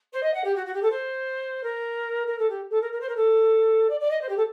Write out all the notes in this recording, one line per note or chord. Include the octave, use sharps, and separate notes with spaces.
C5
D#5
F#5
G4
F#4
F#4
G4
A4
C5
A#4
A#4
A4
G4
A4
A#4
A#4
C5
A#4
A4
D5
D5
D#5
C5
G4
A4